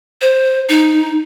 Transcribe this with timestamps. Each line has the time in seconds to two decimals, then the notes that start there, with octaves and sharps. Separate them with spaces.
0.21 C5
0.69 D#4